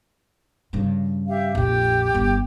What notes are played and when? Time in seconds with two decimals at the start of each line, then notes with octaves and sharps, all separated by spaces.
0.73 G2 C#3
1.27 G4 E5 F5
1.55 A#1 F2 G4
2.14 G1 G2